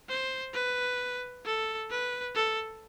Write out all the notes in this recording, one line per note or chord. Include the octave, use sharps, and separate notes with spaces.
C5
B4
A4
B4
A4